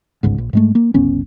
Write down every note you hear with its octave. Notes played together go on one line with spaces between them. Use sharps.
G1 C#2 G#2
A#1
G#2 G#3 A3
A#3
G1 C#2 B3 C#4